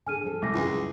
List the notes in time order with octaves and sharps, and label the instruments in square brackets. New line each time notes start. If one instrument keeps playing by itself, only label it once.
[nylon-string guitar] D3 G#4 [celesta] G#5 F6 D#7
[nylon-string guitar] F3 C4 A4
[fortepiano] C2 [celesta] D6 A#6
[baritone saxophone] C#2 [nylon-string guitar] F#2 F#3 G3 [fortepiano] E3 G#4